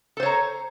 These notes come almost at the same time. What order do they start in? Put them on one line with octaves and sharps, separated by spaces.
A4 C5 C#5 A#5